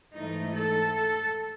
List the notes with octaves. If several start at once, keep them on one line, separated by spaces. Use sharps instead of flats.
G#2 E3 A3 D#4
A4